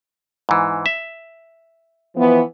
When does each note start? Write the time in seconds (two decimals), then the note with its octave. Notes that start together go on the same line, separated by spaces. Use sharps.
0.49 G#2 E3
0.86 E5
2.16 E3 F3 B3